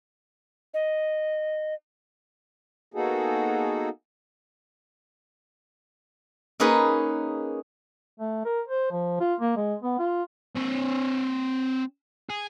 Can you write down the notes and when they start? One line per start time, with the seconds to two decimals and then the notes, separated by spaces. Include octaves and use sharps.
0.74 D#5
2.94 A#3 B3 D#4 F#4 G#4 A4
6.60 A#3 C#4 D#4 G#4 B4
8.19 A3
8.45 A#4
8.68 C5
8.92 F3
9.20 F4
9.40 A#3
9.57 G#3
9.83 B3
9.99 F4
10.57 C4 C#5
12.30 G#4